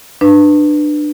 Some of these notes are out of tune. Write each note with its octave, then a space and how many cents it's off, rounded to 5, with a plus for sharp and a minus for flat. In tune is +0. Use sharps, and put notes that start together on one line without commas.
D4 +25 B4 +0